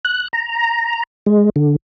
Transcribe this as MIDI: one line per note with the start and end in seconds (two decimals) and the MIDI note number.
0.05 0.28 90
0.33 1.03 82
1.26 1.49 56
1.56 1.76 50